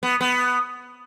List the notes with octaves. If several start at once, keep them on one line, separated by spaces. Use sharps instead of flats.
B3
B3